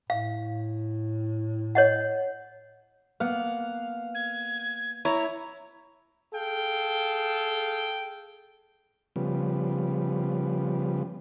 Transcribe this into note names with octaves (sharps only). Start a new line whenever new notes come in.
A2 F5
C#5 D#5 F#5
A#3 B3 F5 F#5
G#6
E4 C#5 A#5
G#4 A4 F5 G5
C#3 F3 G3 B3